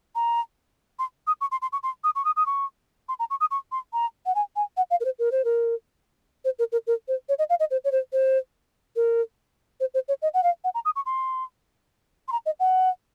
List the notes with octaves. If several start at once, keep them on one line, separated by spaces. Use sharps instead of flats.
A#5
C6
D#6
C#6
C6
C6
C#6
C6
D#6
C#6
D#6
D#6
C#6
C6
A#5
C#6
D#6
C#6
C6
A#5
F#5
G#5
G#5
F#5
F5
A#4
C5
A#4
C5
A#4
C5
A#4
A#4
A#4
C5
C#5
D#5
F5
D#5
C5
C#5
C5
C5
A#4
C5
C5
C#5
D#5
F#5
F5
F#5
A#5
D#6
C#6
C6
C6
A#5
D#5
F#5